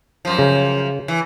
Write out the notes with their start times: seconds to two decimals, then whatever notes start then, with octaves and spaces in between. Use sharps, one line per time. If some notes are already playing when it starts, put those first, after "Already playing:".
0.25 F#2 F3
0.38 C#3
1.08 E3